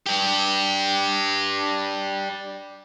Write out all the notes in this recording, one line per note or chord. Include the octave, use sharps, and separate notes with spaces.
D4 G4